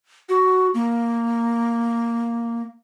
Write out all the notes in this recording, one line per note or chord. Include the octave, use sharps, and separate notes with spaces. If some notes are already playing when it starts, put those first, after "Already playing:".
F#4
A#3